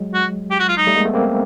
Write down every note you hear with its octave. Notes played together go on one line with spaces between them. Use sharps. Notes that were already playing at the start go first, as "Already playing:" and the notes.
Already playing: F#3 G#3
F#4
G4
F#4
F4
D#4
G3 A3
G#3 A#3
A3 B3
A#3 C4